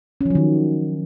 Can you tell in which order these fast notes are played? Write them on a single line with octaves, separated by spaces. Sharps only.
C#4 F3 F#3 D#3